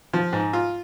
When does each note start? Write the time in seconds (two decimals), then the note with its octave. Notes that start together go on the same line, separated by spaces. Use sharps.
0.13 F3
0.33 G#2
0.53 F4